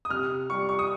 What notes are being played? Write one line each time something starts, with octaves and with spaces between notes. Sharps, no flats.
D#6
C3 F6
G3 C#6
C#6
D#6